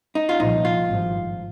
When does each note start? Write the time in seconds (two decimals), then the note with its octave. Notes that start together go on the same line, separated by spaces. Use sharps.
0.15 D#4
0.29 F4
0.40 C2 A#2 F3 D#4
0.65 F4
0.89 G#1 G2 F3